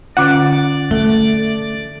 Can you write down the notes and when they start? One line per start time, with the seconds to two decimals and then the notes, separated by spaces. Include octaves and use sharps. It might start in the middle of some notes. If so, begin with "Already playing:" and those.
0.17 D3 C#4 F4 D5 F#5
0.91 A3 A4